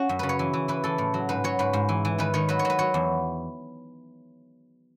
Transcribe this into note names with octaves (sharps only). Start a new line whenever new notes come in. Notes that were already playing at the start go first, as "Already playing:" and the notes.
Already playing: C#4 F#4
F#2
C#3 B4
C#5
E3
E3
E3 B4
E3 A4
A2
F#3
G#2 B4
F#3 C#5
G#2 B4
G#2
E3
E3
D#3 B4
D#3 C#5
F#3 B4
C#5
F#3
B4
F#3 C#5
E2